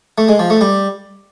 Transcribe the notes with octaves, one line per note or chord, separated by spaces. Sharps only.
A3
G#3
F3
A3
G3